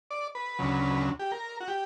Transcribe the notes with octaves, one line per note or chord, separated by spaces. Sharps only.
D5
B4
D2 C#3 F#3
G4
A#4
F#4
G4